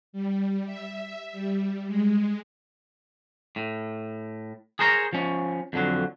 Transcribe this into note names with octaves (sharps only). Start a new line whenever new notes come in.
G3
E5
G3
G#3
A2
G#4 A#4 C5 C#5 A#5
F3 C#4
F2 D3 F#3